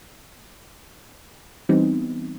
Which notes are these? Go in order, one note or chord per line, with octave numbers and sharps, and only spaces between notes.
E3 G3 B3 C4 D#4